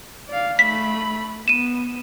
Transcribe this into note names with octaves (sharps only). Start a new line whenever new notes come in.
D5 F5
A3 B5 B6
B3 D#7 E7